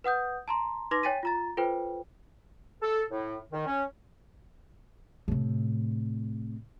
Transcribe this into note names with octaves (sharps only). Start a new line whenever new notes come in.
B4 F#5 D#6 G6
A5 A#5 C6
D#4 B4 C6 D6 A#6
C#5 G5 G#5 A6 B6 D#7
F4 A#5 A6
F4 A4 B4 C5 G5
A4
A2
D#3
C#4
A2 C3